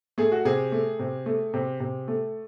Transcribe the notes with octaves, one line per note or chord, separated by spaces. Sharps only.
A3 G#4
F#4
C3 G#4
A3
C3
A3
C3
C3
A3